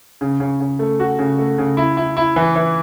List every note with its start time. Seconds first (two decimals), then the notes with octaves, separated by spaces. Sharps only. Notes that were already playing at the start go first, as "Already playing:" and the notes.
0.21 C#3
0.40 C#3
0.60 C#3
0.79 A3
1.00 F#4
1.19 C#3
1.38 A3
1.58 C#3
1.77 E4
1.97 E4
2.17 E4
2.36 E3
2.56 E3